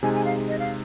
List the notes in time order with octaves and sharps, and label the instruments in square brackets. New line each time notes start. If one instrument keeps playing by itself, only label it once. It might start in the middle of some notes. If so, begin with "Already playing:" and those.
[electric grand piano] C3 G#3 D#4 G#4 [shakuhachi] G#5
[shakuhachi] G#5
F5
D#5
F5